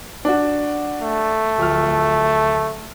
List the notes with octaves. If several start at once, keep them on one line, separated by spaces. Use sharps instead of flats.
D4 F#4
A3
D1 F3 F6